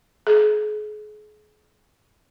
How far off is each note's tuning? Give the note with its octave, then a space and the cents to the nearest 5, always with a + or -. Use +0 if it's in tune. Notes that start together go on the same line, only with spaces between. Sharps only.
G#4 +35